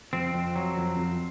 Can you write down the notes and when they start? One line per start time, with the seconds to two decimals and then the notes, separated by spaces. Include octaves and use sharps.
0.13 F2 C4
0.34 F2
0.56 F#3
0.78 F2
0.98 F2